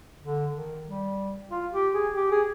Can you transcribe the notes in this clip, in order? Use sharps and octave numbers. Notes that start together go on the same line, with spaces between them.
D3
D#3
G3
F4
G4
G#4
G4
G#4